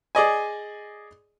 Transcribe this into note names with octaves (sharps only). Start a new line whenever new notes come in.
G#4 D5 D#5 G#5